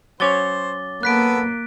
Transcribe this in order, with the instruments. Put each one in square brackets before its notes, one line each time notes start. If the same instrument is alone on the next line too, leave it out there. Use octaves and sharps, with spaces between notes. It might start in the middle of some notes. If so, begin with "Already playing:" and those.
[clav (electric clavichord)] F#3 C#4 C#5 [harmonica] C5 [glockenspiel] D6 A6 G7
[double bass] A#3 [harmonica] B3 A4 B4 [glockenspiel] F#6 B6 D7